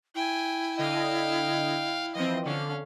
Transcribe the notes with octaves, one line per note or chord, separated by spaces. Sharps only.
E4 G5 G#5
D3 D#5 F5 G5
E3 F3 C4 D#5
D3 C#4 F5